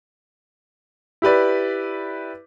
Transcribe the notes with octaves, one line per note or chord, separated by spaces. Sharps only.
E4 G4 B4 D5